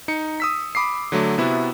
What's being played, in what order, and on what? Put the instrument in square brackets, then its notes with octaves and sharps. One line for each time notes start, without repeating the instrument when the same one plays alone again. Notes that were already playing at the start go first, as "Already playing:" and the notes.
[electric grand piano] D#4 C#7
D#6 E6 B6
B5 D6 D#6 C7
D3 F#3 A3
C3 B3 E4 F#4